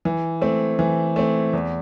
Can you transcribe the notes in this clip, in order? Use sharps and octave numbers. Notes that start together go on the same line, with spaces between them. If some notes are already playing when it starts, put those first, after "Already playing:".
E3
A3 C4
E3
A3 C4
E2